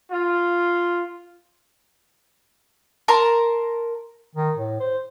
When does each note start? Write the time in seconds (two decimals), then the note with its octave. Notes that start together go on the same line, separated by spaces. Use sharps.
0.11 F4
3.08 A#4 A5 A#5 C6
4.35 D#3
4.56 A2
4.80 C5